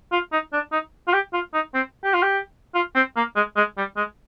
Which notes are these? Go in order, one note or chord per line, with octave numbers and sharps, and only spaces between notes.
F4
D#4
D4
D#4
F4
G4
F4
D#4
C4
G4
F4
G4
F4
C4
A#3
G#3
G#3
G3
G#3